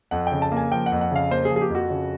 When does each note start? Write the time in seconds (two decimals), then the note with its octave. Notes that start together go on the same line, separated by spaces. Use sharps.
0.11 F2 F#5
0.27 C#3 G5
0.42 A5
0.52 A#3
0.57 G#5
0.72 F3 G5
0.86 F#5
0.92 F2
1.01 F#5
1.11 C#3 F5
1.30 A#3 C5
1.45 G#4
1.51 F3
1.56 G#4
1.61 G4
1.70 F2 F#4
1.90 C#3